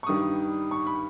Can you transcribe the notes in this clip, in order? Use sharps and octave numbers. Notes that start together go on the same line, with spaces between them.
C#6
G2 D#3 G3 D#6
C#6
B5